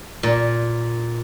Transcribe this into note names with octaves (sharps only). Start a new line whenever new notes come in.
A#2